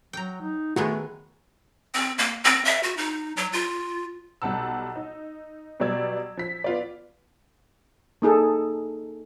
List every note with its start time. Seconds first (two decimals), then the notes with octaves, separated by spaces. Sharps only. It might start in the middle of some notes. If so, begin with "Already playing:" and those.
0.13 F#3 G5 A#5
0.42 D#4
0.76 D#3 G#3 A3 B3 F#4
1.94 C4
2.18 A#3
2.44 C4
2.65 E5
2.83 F#4
2.97 D#4
3.37 F#3
3.53 F4
4.42 B1 G3 F#5 A5 E6
4.96 D#4
5.80 B2 F#3 G3 D5 E6 G#6
6.37 F3 B6
6.64 B3 F4 D5
8.22 A#3 D#4 G#4 A4